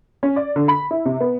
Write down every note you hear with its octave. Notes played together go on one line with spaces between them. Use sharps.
C#4
D5
D3
B5
E4
C3
B3